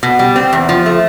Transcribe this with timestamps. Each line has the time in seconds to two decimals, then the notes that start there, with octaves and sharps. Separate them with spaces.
0.03 B2
0.19 G3
0.36 C4
0.53 E2
0.69 F3
0.86 A3